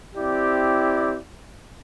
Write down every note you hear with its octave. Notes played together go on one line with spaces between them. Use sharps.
C4 E4 G4 D5